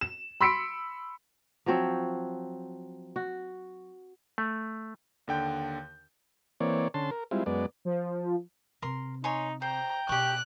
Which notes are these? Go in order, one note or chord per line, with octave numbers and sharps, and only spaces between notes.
E7
B5 C6 E6 B6 C#7 D7
F3 F#3 C4 C#5
F#4
A3
D#2 D3 G5 G6
E3 A#3 C4 C#5 D5
D3 C#4 A5 C6
A#4
G3 G#3 C4 E4 F4
F#2 G#3 B3 D5
F3
C3 A#4 C6
D#4 C#5 G#5 C6
C5 G5 A#5
B2 G4 C#6 F#6